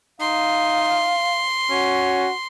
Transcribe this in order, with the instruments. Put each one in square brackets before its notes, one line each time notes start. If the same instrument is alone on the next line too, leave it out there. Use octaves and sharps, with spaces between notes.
[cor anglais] D#4 [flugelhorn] F5 [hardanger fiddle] C6
[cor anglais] C#4 [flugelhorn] F#4